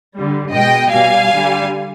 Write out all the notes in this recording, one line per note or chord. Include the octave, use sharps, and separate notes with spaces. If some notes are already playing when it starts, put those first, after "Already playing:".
D3 G3
B2 G#3 D#5 G5
B2 G3 F5 G#5
D3 G3